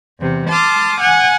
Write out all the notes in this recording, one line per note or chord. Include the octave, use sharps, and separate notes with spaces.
E2 C3
A5 C6 D6 D#6 F6
F#5 G#5